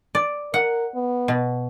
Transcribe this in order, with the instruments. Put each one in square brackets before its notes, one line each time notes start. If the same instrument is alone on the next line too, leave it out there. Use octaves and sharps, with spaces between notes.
[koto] D5
[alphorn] A#4 [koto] F#5
[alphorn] B3
[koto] B2